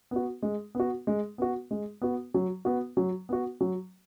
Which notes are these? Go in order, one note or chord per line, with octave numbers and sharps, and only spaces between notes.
B3 F#4
G#3
B3 F#4
G#3
B3 F#4
G#3
B3 F#4
F#3
B3 F#4
F#3
B3 F#4
F#3